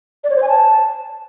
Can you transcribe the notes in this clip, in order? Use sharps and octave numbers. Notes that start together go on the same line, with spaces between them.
D5
C#5
C5
G#5
A5